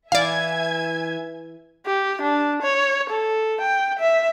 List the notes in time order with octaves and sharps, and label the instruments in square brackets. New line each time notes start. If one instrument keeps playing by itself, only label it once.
[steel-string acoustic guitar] E3 [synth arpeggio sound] D5 F5 [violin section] E5 G#5 G#6
[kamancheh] G4
D4
C#5
A4
G5
E5